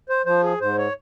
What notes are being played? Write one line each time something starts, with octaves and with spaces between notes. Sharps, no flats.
C5
F3 C5
G#4
G#2 C5
C#5